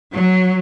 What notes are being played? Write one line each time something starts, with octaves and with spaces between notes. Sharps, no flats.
F#3